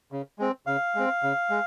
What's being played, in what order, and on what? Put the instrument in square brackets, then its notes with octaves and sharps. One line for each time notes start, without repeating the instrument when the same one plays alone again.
[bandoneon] C#3
G#3 C4
C#3 F5
G#3 C4
C#3
G#3